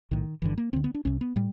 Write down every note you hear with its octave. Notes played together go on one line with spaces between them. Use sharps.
B1 A2 D#3
G1 G2 D3 E3
A#3
D2 D3 C4
B3
D4
C2 C3 C#4
B3
A2 G3